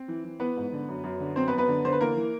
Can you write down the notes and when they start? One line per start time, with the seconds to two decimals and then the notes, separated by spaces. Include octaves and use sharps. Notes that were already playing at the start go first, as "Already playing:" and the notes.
Already playing: C4
0.08 E3
0.24 E3
0.40 E3 B3 B4
0.57 G#2
0.72 D3
0.88 F#2
1.04 F#2
1.20 D3
1.36 F#2 C4 C5
1.48 B3 B4
1.52 F#2
1.58 B3 B4
1.68 D3
1.85 D3 C5
1.93 B4
2.01 E3 A#3 A#4
2.16 E3